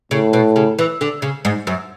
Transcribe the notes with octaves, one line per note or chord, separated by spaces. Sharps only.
A2 C#3
B2
C#3
E3
D3
C#3
G#2
F#2